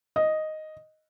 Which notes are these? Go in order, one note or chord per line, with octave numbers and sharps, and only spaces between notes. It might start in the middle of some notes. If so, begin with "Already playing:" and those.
D#5